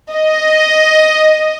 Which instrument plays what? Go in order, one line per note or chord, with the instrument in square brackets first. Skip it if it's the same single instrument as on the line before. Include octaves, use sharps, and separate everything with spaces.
[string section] D#5